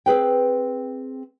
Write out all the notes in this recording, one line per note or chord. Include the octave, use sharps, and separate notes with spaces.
C4 G#4 B4 G5